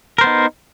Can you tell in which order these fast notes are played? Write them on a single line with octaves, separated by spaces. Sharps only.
A#4 C5 B3 D#4